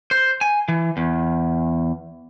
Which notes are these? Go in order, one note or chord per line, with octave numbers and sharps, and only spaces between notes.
C5
G#5
E3
E2